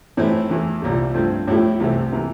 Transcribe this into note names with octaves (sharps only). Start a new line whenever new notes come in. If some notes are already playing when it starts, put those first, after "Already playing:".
A2 E3 A3 C4 E4
E2 E3 A3
C2 A#2 G3
G2 F3 A3 C4
A2 F3 A3 E4 G4
C2 C3 E3 A3 C4
C3 E3 A#3